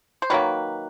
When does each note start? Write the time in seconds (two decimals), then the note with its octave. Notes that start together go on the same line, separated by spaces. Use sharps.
0.22 C5
0.30 D#3 F#3 A#3 B4